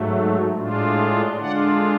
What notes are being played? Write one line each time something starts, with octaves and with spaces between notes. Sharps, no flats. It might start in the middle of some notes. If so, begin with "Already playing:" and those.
Already playing: G#2 F#3 A3
A2 G#3 D4 F4
D3 G#3 D4 F4 D5 F#5